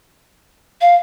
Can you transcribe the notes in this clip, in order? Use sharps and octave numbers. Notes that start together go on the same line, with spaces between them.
F5